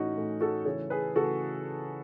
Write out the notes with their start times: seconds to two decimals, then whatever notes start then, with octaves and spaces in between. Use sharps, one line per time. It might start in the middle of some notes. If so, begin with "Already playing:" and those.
Already playing: A2 E3 A3 C#4 D#4 F#4
0.17 A2 E3 A3
0.40 F#4 A4
0.65 C#3 E3 A3 A4 C#5
0.90 G#4 B4
1.15 C#3 E3 A3 F#4 A4